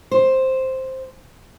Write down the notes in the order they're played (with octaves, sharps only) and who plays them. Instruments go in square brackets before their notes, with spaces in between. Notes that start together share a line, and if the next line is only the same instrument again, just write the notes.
[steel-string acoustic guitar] C5